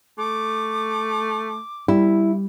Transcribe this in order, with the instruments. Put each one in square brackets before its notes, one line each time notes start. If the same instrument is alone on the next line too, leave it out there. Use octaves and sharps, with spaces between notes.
[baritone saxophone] A3 [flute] D6
[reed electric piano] G3 [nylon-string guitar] E4